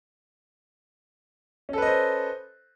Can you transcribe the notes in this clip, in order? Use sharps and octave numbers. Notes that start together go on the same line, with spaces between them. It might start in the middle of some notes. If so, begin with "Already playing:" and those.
C#4 A4 B4 C5 D#5